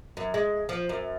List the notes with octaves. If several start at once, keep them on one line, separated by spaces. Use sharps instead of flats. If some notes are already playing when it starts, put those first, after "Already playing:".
F#2
G#3
F3
F#2